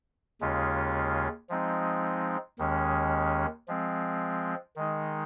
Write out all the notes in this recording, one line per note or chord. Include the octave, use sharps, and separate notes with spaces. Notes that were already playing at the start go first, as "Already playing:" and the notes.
D#2 C#3 G#3 C#4 F4
F3 G#3 C4 D#4
D#2 D#3 G#3 C#4
F3 G#3 C4
D#3 G#3 D#4